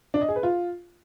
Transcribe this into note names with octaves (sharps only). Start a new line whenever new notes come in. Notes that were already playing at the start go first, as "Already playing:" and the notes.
D4
D#5
G#4
B4
F4